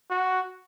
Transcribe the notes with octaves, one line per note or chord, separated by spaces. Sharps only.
F#4